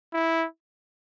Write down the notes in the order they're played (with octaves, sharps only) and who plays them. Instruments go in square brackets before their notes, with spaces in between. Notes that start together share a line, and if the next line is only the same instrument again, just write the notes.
[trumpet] E4